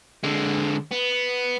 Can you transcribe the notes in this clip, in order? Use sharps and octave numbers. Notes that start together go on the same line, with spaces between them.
D3 G#3
B3